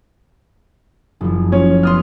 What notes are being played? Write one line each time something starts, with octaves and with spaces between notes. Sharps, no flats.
F#1 F3
C#4 F4 C#5
B3 D5 C6 D#6 F6